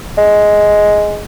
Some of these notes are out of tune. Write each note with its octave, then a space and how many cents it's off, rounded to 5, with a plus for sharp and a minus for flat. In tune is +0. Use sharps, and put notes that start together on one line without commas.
G#3 +5